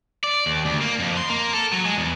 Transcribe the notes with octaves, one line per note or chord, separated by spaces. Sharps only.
D5
D#2
D2
A#3
F2
C6
A#3
A4
F#3
G#3
E2